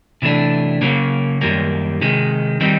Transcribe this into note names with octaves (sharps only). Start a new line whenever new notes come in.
C3 E3 A3 D4
C#3 F#3 A#3
F#2 D#3 G3 A#3
C3 D#3 G#3
D#3 G3 C4 D#4